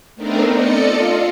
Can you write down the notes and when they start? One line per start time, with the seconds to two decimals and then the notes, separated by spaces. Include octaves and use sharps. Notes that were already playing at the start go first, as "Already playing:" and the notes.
0.16 A3 B3 C4 D4 D#4 A#4
0.53 A4 D5 D#5 C#7
0.86 F4